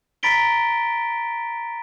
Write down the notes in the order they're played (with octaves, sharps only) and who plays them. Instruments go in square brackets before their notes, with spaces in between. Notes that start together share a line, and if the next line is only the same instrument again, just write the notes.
[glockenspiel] A#5 B5 A6 B6 D7 G7